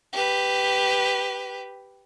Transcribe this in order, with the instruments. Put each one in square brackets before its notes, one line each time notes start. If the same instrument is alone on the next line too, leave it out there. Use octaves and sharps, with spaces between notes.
[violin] G4 B4